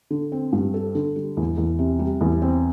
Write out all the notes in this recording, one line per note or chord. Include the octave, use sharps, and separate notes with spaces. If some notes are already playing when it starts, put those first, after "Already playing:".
D3
C4
G2
A4
D3
G3
E2
E2
C3
G3
E2
C4